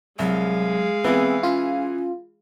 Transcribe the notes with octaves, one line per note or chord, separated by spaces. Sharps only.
C2 F#3 G#3 F5
E3 B3 C4 E4 G#4
C#4 F4